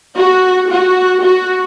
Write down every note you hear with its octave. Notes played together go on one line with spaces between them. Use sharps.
F#4
F#4
F#4